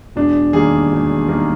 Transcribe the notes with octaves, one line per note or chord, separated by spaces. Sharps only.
E1 D4
D#2 D#3 G3 A#3 G#4
E1
D#2 D#3 G3 A#3